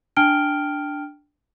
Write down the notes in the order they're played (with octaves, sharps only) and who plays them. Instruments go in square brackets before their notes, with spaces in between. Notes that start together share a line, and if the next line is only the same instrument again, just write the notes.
[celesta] D4 G5 A5 F6 D7 G7